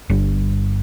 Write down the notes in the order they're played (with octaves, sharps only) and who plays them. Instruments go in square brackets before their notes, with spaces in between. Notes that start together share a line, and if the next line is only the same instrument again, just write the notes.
[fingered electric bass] G1 G2